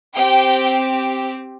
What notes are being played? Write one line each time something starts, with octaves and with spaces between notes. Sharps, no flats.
C4 G4 G5